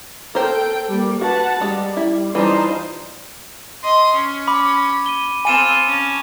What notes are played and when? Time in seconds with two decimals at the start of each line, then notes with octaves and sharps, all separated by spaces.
0.35 A4 A#4 C5 G5
0.90 G3 A#3
1.21 F#4 B4 F#5 A5
1.61 G3 G#3
1.97 E4
2.35 E3 G3 D4 D#4 F4 C5
3.82 D#5 C6
4.14 C#4
4.48 B5 D6
5.06 D#7 G7
5.45 C4 F4 A4 G#5 D#7 E7
5.86 C#4 A5